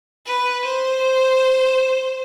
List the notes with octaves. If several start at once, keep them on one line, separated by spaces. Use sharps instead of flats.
B4
C5